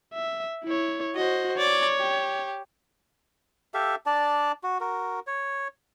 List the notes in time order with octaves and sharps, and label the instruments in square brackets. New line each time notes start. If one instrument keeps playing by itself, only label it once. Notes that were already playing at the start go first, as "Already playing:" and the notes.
[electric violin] E5
E4 C#5
[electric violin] F#4 [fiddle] C5 D#5
[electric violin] C#5 [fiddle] D5
[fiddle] G4
[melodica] G4 A4 E5 F5
D4 D5 A5
F#4
F#4 A#4
C#5